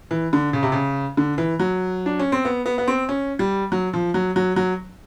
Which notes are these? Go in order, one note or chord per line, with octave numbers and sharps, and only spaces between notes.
E3
D3
C#3
C3
C#3
D3
E3
F#3
D4
C#4
C4
B3
B3
B3
C4
C#4
G3
F#3
F3
F#3
F#3
F#3